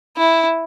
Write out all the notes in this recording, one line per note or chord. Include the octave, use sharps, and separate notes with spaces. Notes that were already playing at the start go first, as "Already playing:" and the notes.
E4